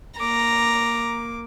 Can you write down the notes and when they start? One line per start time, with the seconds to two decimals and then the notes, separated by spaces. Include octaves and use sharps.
0.19 A#3 A#5 D6